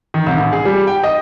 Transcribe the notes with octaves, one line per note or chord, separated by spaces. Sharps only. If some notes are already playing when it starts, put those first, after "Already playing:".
D#3
C2
A1
G#4
G3
G5
D#5